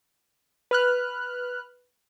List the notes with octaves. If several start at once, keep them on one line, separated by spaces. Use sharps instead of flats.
B4 F6 F#6